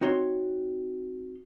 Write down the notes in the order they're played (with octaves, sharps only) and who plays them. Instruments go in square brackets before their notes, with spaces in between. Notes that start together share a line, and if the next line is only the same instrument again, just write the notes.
[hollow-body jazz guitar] C4 D#4 F#4 C#5 C6